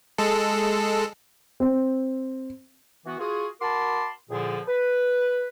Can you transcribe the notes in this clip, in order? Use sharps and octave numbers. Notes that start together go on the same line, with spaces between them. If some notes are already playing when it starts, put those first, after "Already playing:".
G#3 A4
C4
E3 B3 F#4
F4 F#4 G#4
F#4 A#4 A5 B5 C6 D6
E2 A#2 D3 F3 G#4
B4